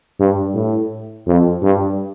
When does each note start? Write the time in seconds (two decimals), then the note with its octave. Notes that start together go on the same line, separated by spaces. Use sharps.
0.20 G2
0.55 A2
1.27 F2
1.62 G2